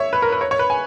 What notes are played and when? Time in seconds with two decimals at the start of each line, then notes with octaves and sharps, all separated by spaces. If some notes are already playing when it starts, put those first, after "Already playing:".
Already playing: C#5 E5
0.13 B4
0.22 A#4
0.32 B4
0.41 C#5
0.51 C#5
0.59 B4
0.70 G#5